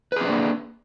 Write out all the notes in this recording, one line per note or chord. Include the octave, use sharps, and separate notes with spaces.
A#3 C4 D4 G#4 B4